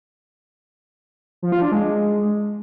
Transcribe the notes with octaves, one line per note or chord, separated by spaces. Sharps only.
F3
F4
D4
G#3